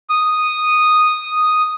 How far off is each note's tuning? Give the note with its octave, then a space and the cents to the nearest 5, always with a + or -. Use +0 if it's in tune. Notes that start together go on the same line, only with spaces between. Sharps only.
D#6 -5